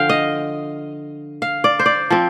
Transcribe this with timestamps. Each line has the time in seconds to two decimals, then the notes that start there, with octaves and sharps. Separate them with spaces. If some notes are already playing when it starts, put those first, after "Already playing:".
Already playing: D3 F3 F5 G5
0.09 D#5
1.42 F5
1.64 D5
1.79 C5
1.86 D5
2.10 F3 C4